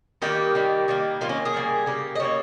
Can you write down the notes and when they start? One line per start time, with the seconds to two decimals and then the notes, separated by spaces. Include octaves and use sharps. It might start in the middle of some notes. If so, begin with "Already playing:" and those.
0.22 D#3 G3 A#3 G4
0.55 D#3 G3 A#3
0.88 D#3 G3 A#3
1.21 D#3 G3 A#3 F4
1.29 C#4
1.45 G#4
1.54 C#3 G3 A#3
1.86 C#3 G3 A#3 G4
2.15 D#5
2.19 C#3 G3 A#3 C#5